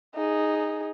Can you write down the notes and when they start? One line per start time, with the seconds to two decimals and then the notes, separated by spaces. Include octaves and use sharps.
0.15 D#4 G#4